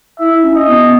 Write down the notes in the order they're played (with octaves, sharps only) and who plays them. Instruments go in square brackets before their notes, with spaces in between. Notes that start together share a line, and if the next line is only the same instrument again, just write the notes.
[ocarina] E4 [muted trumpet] E5
[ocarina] C#4
[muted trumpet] D#5
[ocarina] B3